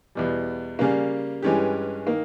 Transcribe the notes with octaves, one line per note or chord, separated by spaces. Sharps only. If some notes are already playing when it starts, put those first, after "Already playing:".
E2 B2 G3
C#3 G3 A#3
G2 E3 G#3 C#4 G4
D#3 A#3